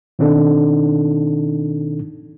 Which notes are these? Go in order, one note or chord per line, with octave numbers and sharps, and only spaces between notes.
B2 D#3 C4 D4 D#4 A4